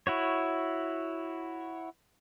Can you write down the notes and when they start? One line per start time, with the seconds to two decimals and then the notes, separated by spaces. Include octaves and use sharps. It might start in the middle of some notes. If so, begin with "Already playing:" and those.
0.07 E4 F#4 C#5